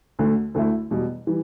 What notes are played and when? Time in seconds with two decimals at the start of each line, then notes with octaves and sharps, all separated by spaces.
0.19 D2 D3 A3
0.54 D2 D3 A3 E4
0.91 E2 B2 G3
1.27 E3 G3